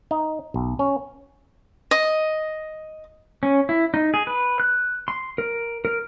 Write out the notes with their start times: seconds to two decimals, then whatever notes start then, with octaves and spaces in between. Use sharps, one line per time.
0.11 D#4
0.54 B1
0.79 C#4
1.91 D#5
3.43 C#4
3.69 E4
3.94 D#4
4.14 G#4
4.27 B4
4.60 F#6
5.08 C6
5.38 A#4
5.85 A#4